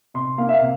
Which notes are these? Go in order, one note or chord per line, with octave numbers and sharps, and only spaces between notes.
C3 C6
A#3 F5
E5
F5
C3